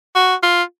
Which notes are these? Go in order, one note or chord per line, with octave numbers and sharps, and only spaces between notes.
F#4
F4